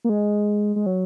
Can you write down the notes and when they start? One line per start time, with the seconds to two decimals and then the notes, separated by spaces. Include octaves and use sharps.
0.04 A#3
0.09 G#3
0.76 G#3
0.86 F#3